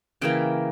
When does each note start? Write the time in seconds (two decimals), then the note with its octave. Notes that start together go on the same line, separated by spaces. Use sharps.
0.21 C#3 E3 A#3 G5